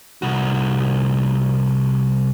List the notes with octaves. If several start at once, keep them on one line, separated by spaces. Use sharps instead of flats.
C2 F#4